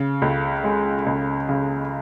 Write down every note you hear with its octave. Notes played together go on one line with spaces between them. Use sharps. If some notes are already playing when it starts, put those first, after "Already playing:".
Already playing: C#3
C#2
G#3
C#2
C#3